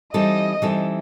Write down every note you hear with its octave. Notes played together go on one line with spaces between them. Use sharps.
E3 G3 C4 D#4 A4 D#5
E3 G3 C4 D#4 A4